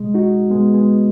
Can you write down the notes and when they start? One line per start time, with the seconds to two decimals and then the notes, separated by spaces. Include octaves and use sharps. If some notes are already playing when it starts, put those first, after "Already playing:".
Already playing: B2 G#3
0.14 D#4 F#4
0.50 B2 G#3 B3
0.74 G#3 B3